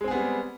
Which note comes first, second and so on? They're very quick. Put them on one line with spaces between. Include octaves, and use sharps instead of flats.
G#3 C4 G#4 B3 G3